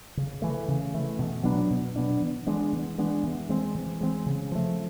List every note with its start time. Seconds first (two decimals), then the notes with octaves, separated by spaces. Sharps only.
0.17 C#3
0.42 E3 A3
0.68 C#3
0.94 E3 A3
1.19 B2
1.45 F#3 B3 D4
1.70 B2
1.96 F#3 B3 D4
2.21 E3
2.47 G#3 B3 D4
2.73 E3
2.98 G#3 B3 D4
3.23 E3
3.49 G#3 C4
3.75 E3
4.01 G#3 C4
4.26 C#3
4.52 F3 A3